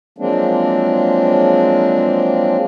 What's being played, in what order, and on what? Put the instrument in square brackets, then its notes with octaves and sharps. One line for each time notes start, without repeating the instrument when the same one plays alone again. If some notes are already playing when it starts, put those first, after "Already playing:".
[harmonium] F3 F#3 G#3 A#3 C4 D4